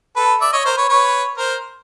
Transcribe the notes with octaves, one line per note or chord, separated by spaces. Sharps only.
A4 B4
D5 E5
C#5 D#5
A#4 C5
B4 C#5
B4 C#5
A#4 C5